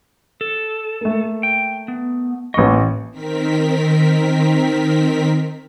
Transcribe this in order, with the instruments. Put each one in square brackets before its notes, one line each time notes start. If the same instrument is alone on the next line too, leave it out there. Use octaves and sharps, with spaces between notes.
[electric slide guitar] A4
[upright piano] A3 A#3
[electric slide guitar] G5
B3
[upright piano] A1 C#6 [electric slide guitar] A#3 D#5
[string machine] D#3 C4 A#4 B6